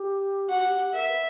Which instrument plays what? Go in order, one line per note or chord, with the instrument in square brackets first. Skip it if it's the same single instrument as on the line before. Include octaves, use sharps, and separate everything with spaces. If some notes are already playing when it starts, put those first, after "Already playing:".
Already playing: [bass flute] G4
[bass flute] F#4 [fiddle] F#5
[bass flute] G4
G4
[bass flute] A#4 [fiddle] E5
[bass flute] B4